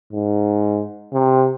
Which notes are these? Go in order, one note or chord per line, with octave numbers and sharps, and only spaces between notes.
G#2
C3